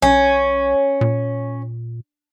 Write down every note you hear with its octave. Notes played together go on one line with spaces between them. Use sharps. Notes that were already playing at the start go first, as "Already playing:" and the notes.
B1 C#4
A#2